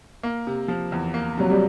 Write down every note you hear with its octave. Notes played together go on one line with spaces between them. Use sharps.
A#3
C3
F3
E2
A#3
C3 F#3
G3